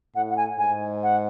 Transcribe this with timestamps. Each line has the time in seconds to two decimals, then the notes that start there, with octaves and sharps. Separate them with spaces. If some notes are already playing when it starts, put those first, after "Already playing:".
0.15 A2 F#5
0.30 F#5
0.37 G#5
0.59 G#2 G#5
1.03 F#5